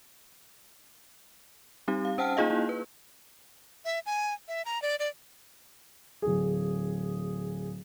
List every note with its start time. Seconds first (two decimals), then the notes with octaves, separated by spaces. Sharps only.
1.88 G3 C4 D#4 G4
2.05 F5
2.18 C#4 C5 F#5 G5 A5 F6
2.37 A#3 D#4 F4 G#4 D#5 F5
2.50 A#3 E4
2.69 B4
3.85 E5
4.06 G#5
4.48 E5
4.65 A#5
4.82 D5
4.99 D5
6.22 D1 G#4